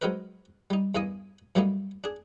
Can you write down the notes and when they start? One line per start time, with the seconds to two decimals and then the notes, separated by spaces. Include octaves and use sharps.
0.02 F#3 G#3 C4 D#4 A#4 B4
0.70 G3 D#4
0.95 E2 G2 A#3 D#5 G#5 D#6
1.55 G2 F#3 G3 A3 A#3 D#4
2.04 D4 G#4